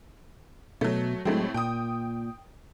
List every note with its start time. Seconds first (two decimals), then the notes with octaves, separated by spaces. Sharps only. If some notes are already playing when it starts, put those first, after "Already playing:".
0.81 B2 F#3 A3
1.25 A2 F#3 G#3 A3 C4
1.54 A#2 G5 D#6